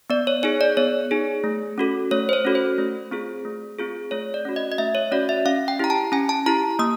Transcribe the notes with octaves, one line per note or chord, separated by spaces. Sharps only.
B3 D5
C#5
D#4 G#4 C#5
D5
B3 C#5
D#4 G#4
A3
C#4 F#4 A4
A3 C#5
C5
C#5
C#4 F#4 A4
C5
A3
C4 F4 G#4
A3
C4 F4 G#4
A3 C#5
D5
C#4 F#4
D#5
D#5
A3 E5
C#5
C#4 F#4 D5
E5
C#4 F5
G5
E4 G4 A#5
A5
C#4 G#5
A5
E4 G4 A#5
A#3 D#6